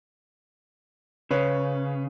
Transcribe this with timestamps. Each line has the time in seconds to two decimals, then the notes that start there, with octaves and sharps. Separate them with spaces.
1.31 C#3 B4 C#5